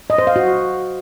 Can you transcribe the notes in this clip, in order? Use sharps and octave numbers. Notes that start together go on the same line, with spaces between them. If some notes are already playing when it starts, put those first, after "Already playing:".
D#5
C5
F5
F#4